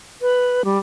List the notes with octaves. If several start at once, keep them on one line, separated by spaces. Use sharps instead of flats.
B4
G3